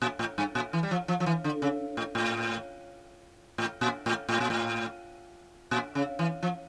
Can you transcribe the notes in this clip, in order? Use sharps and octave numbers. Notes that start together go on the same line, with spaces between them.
A#2
A2
G2
A#2
E3
G3
F3
F3
F3
E3
D3
C#3
A2
A2
A2
A#2
A2
A2
A#2
A2
A#2
C#3
E3
F3